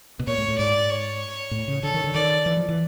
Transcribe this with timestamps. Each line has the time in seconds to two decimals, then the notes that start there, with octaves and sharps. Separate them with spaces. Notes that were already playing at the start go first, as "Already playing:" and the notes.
0.20 B2
0.27 A#2 C#5
0.38 A2
0.48 A2
0.58 G#2 D5
0.90 C#5
1.51 A2
1.68 C#3
1.83 D3 A4
1.94 D#3
2.04 D3
2.14 D#3 D5
2.46 E3
2.57 F3
2.69 E3